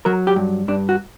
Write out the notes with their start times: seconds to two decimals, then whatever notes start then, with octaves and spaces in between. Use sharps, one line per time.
0.05 F#3 A#4
0.27 G4
0.36 G2
0.68 G2 D4
0.89 F#4